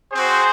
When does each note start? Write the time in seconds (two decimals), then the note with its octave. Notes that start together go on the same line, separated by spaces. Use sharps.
0.13 C4 F#4 G#4 C5